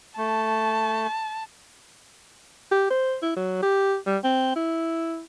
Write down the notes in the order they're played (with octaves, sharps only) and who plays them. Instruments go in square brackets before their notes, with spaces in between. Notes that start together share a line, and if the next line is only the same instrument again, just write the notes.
[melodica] A3 [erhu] A5
[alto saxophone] G4
C5
E4
F#3
G4
G3
C4
E4